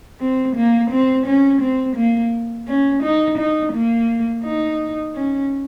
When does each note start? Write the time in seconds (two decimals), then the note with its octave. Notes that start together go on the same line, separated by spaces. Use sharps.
0.20 C4
0.56 A#3
0.91 C4
1.26 C#4
1.61 C4
1.96 A#3
2.67 C#4
3.03 D#4
3.38 D#4
3.73 A#3
4.44 D#4
5.15 C#4